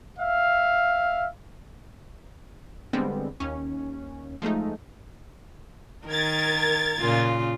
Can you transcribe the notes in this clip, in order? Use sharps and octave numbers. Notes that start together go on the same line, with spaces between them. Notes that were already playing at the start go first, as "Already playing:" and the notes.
E5 F5
D3 G3 G#3 B3 C4
D#2 C#4
F3 G#3 A3 D#4
D#3 A#4 G#6 A6
A#2 C#3 F4